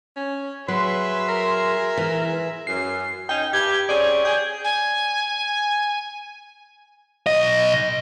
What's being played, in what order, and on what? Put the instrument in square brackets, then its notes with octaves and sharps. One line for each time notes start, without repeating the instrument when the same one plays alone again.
[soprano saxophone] C#4
[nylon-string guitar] F#3 [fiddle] G#4 E5 [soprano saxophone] B4 [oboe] C6
[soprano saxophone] A#4
[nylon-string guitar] E3
[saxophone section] F#2 [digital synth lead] C7
[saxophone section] C#4 D#4 [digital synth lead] G5
[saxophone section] G2 G4 [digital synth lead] G#6
[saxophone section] C4 C#4 G#4 [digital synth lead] D5
[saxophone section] G#4 [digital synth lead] G6
[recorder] G#5
[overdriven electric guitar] B1 D#5